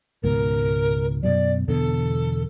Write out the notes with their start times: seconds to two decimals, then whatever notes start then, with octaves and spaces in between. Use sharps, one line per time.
0.24 C#2 G#2 B2 A#4
1.23 F#2 B2 F#3 D5
1.68 E2 B2 D3 A4